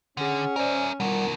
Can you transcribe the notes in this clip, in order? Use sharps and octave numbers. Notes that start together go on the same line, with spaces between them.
D3 C#4 G#4 F#5
A#4 C5 D5 E5 G#5
D2 B2 D#3 G3 F4 A#4 F#5